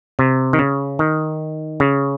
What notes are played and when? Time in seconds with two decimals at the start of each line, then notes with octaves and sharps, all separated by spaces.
0.19 C3
0.53 D#3
0.59 C#3
0.99 D#3
1.80 C#3